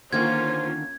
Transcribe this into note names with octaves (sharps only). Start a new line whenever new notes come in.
D3 D#3 A#3 C#4 F4 C5 G#6